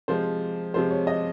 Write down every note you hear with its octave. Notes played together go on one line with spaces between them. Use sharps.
C3 F3 G#3 C5
C3 F3 G#3 C5
C#5
D#5